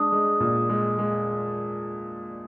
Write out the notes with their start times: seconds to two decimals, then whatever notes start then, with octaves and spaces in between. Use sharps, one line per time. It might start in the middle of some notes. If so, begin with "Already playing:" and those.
Already playing: G#3 D4 D#6
0.12 G#3
0.40 A#2
0.69 G#3
0.99 G#3